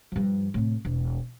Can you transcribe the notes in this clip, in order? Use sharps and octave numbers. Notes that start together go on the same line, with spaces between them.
G2 F3
A2 C3
E1